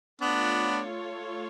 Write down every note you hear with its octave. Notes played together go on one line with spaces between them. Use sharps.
A3 B3 D4 F4 A4 C#5